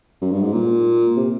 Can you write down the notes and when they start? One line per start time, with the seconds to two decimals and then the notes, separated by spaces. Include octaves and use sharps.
0.22 F#2
0.31 G2
0.42 G#2
0.53 A#2
1.17 C3